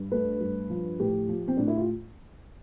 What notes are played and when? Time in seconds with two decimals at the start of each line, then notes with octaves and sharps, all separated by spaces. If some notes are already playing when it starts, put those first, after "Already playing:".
Already playing: G2
0.12 A3 B4
0.41 G2
0.70 F3
1.00 A2 G4
1.28 F3
1.48 C4
1.57 A2 D4
1.68 E4
1.77 F4